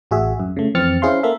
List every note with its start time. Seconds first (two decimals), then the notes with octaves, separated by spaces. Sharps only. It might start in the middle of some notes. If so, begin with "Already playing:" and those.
0.11 A1 F#4 G#4 E5
0.40 F#2
0.57 C#3 A3
0.75 F2 E3 C4 F6 A6 C#7
1.02 C#4 E4 G#4 C5 F5 C6
1.23 A#3 A4 E5